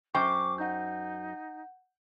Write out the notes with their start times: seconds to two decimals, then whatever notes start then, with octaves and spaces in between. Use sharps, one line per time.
0.15 F#2 C5 G5 C#6 D6
0.58 D#4 F#5 G6